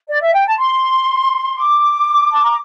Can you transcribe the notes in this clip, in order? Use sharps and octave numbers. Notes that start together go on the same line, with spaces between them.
D5
E5
G5
A5
C6
D6
A5
A#5